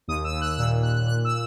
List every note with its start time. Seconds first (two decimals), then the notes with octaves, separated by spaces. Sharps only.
0.08 D#2 D#6
0.24 E6
0.33 D#2
0.41 F#6
0.58 A#2 E6
0.83 A#2 F#6
1.07 A#2 F#6
1.25 E6